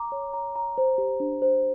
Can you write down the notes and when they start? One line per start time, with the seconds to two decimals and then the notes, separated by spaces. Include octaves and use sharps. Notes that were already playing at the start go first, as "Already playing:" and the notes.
Already playing: A#5 D6
0.12 C#5
0.33 A#5
0.56 A#5
0.78 C5
0.98 G4
1.20 D4
1.42 C5